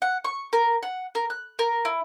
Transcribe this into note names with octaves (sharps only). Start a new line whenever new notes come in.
F#5
C#6
A#4
F#5
A#4
F#6
A#4
E4